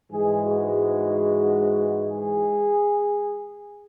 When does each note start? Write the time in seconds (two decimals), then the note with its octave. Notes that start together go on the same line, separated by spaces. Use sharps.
0.10 G#2 E3 G#3 G#4
0.43 F#4
2.07 G#4